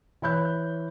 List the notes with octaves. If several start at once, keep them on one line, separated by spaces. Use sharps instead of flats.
E3 C#5 B5 F#6 G6